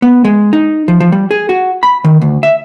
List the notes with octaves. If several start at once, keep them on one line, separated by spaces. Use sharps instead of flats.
B3
G#3
D#4
F3
F3
G3
G#4
F#4
B5
D#3
D2
E5